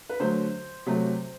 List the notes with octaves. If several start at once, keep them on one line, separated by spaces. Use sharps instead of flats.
B4
D3 F#3 A3 C5
C3 F#3 A3